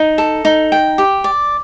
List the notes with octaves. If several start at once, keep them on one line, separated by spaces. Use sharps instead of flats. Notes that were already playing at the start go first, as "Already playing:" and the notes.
Already playing: D#4
A4
D#4
G5
G4
D5